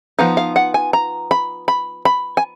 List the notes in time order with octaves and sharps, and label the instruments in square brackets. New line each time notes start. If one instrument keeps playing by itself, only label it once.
[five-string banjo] F3 B3 D#4 F5
F5
F#5
G#5
A#5
B5
B5
B5
G#5